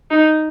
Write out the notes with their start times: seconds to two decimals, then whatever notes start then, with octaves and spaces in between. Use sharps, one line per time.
0.10 D#4